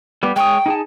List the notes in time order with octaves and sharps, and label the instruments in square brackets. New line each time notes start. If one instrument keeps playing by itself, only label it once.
[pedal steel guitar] G3 B3 G4
[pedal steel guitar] G#3 C#5 D#6 [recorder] G5
[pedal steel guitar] D#4 G#4 A5